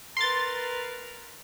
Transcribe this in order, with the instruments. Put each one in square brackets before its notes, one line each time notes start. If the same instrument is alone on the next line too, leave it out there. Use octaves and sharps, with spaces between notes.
[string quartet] A#4 B4 [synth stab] C6 A6